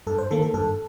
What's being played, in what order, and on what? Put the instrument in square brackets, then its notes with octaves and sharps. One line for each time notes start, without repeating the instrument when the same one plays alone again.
[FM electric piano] G2 A4
C5
D#3 A#3 A4
A4
G2 A4